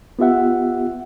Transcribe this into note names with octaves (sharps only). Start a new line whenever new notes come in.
B3 F4 G4 E5 F#5